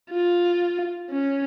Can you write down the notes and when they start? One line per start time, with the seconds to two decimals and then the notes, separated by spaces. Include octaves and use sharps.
0.10 F4
1.11 C#4